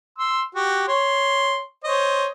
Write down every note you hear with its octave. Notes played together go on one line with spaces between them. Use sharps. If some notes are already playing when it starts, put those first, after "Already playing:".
C6 E6
F#4 G4
C#5 C6
C5 C#5 D#5